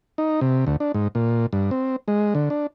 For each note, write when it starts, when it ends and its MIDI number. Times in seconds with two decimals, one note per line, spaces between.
0.18 0.40 63
0.41 0.65 48
0.67 0.76 38
0.80 0.92 62
0.94 1.08 44
1.15 1.46 46
1.53 1.71 43
1.71 1.96 60
2.08 2.34 56
2.35 2.49 50
2.50 2.67 62